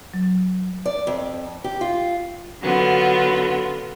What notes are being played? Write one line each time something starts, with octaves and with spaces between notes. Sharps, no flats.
F#3
D5
F2
G4
F4
D3 F#3 B3 F4